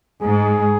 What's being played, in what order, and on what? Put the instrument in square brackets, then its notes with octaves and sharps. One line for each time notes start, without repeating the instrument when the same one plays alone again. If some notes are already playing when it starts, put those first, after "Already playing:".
[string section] G#2 [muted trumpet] G#4